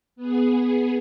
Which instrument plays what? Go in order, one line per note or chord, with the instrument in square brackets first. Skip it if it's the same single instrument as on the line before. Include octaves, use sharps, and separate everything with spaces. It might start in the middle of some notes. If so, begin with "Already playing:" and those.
[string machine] B3 G#4